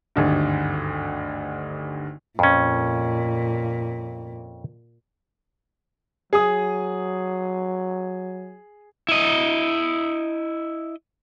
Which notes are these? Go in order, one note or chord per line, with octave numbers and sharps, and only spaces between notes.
G#1 D2 G2
F2 A#2 C#4
F#3 G#4 D#6
E4 D#5